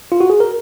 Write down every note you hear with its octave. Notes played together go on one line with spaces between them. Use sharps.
F4
F#4
G#4
A#4